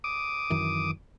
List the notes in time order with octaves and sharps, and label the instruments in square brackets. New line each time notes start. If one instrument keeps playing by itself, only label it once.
[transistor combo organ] D6 D#6
[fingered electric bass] F#2 D#3 E3